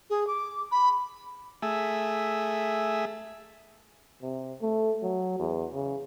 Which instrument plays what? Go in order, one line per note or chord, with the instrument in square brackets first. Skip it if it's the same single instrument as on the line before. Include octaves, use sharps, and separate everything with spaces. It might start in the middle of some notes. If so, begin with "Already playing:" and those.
[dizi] G#4
D6
B5
[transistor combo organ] A3 G#4 E5
[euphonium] C3
A3
F#3
E2
C#3